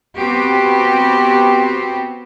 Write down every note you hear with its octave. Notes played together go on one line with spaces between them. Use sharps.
B3 C4 F#4 G4